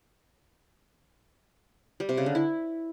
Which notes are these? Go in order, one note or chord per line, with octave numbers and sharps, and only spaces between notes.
G3
C3
C#3
D3
E4